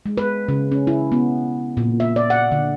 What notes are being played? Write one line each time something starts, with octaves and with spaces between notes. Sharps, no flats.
G#3
B4
C#3
C#4
E4
B3
A#2
E5
D5
F#5
D3